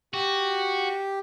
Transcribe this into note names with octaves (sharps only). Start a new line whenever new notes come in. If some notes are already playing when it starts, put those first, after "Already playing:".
F#4 G4